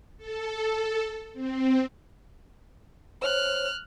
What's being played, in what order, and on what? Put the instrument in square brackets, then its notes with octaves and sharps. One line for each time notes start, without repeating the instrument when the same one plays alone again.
[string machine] A4
C4
[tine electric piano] C5 C#5 [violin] F6 F#6